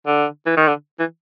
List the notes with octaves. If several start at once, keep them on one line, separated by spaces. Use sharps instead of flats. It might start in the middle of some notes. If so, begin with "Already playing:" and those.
D3
E3
D#3
D3
E3